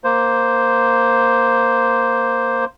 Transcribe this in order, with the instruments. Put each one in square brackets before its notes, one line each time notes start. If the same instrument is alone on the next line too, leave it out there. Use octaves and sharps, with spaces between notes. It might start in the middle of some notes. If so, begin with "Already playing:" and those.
[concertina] A#3 C5